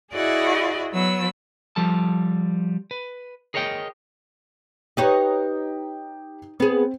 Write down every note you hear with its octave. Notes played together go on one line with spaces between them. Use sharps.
E4 F#4 G#4 D5 D#5
F#3 B3 E6
F3 G3 A4 A5
B4
G#4 A#4 C#5 D#5 F#5 G5
D#4 G4 B4 C#5 G5
B3 C4 G#4